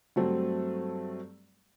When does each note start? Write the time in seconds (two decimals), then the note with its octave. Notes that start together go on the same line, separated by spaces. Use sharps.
0.16 G2 F#3 A3 C4